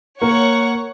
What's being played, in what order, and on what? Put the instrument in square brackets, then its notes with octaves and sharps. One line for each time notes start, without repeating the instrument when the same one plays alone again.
[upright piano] A#3 [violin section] C#5 F#5 C#6